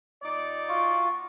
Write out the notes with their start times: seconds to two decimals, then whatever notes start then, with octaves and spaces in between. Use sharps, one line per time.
0.23 A#2 D#4 D5
0.69 F4 F#4